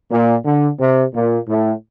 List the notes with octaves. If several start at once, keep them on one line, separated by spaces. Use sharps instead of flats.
A#2
D3
C3
A#2
A2